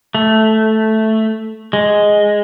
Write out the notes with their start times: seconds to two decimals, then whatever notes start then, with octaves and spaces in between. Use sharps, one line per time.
0.15 A3
1.73 G#3